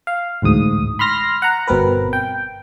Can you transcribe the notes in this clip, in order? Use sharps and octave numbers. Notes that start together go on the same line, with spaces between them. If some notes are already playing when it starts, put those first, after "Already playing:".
F5
A1 D2 G#2 D#6
B5 C6 F6 A#6
F#5 A#5
G1 B2 C4 A#4 B4
G5